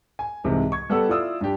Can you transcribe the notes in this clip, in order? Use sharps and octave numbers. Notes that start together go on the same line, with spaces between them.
G#5
C2 G#2 C3 E3 G#3
C#6 G#6
G3 B3 A4 F#5 E6
E4 F4 D5 D#6 E6
G2 D4 G4